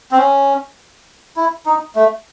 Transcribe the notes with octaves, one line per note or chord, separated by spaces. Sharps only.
C4
C#4
E4
D#4
A3